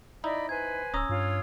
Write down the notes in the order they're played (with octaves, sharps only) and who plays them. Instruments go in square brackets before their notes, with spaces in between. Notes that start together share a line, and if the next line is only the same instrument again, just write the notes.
[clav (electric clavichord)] D#4 E4 [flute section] D5 D#5 B5
[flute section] B4 C5 G#5 [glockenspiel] G#6
[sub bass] D1 [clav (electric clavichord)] C#4 A#5 [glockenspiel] D#6 E6
[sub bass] G2 [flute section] F4 C#5